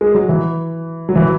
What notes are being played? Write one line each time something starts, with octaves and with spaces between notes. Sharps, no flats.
G#3
F#3
E3
F#3
E3